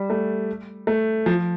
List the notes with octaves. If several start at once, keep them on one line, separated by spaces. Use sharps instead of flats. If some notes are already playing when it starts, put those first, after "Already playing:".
Already playing: G3
A3
A3
F3